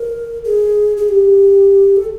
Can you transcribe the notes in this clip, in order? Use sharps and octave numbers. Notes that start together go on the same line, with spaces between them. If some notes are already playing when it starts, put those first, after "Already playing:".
Already playing: A#4
G#4
G#4
G4
A4